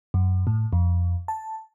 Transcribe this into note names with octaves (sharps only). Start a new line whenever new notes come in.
F#2
A2
F2
A5